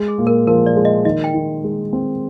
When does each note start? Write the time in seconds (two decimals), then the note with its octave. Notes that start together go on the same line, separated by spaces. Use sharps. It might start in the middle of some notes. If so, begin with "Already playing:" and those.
Already playing: G#3
0.08 G#4
0.18 A#2
0.27 A#4
0.47 F3 A#4
0.66 D5
0.76 G#3
0.85 D#5
1.05 D#3 D#5
1.24 G5
1.34 D#3
1.64 G#3
1.93 C4